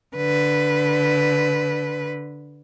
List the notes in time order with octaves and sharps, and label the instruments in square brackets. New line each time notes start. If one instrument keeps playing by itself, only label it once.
[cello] D3 B4